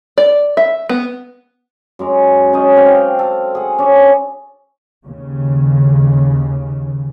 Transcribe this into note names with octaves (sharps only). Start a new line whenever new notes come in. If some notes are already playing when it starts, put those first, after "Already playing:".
D5
E5
B3
F#2 G#3 A#4
C#4 D#4 D#5
C4 D5 F5 G5
A4
G#4 F#5
C#4 D4 D5
D#2 C#3